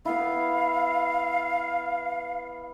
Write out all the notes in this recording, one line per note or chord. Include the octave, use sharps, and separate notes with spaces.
B3 E4 F5